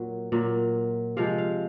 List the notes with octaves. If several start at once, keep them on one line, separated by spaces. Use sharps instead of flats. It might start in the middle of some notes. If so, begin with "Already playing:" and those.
Already playing: A#2 F#3
A#2 F#3
C3 F3 G#3 F5
F5